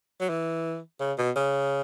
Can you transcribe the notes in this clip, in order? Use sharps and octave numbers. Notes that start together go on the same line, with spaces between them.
F#3
E3
C#3
B2
C#3